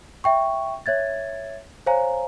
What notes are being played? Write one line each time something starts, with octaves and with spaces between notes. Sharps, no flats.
E5 G5 C#6
C#5 E5 G#6 A6
C5 C#5 F5 G#5 A#5